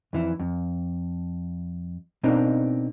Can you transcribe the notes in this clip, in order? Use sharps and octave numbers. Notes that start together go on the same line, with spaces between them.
F2 E3 E4
F2
B2 A#3 C4 D4 D#4